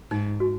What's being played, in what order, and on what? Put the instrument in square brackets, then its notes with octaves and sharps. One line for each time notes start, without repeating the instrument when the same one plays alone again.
[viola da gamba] G#2 [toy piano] D#4
[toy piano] F#4